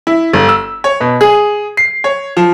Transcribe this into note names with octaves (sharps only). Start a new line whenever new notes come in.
E4
G1
E6
C#5
B2
G#4
C7
C#5
F3